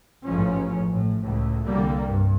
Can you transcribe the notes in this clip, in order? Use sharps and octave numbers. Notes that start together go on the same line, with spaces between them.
A1 G#2 F3 C#4
A2
C#2 A2
C2 D3 G3 A#3
G2